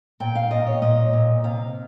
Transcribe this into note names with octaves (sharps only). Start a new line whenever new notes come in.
A#2 G5
F5
A#2 D#5
C#5
A#2 D#5
A#2
C3 F5